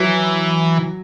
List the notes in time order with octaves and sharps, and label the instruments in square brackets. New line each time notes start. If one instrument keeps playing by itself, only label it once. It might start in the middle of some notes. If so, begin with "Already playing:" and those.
Already playing: [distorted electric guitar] E3 [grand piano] F#3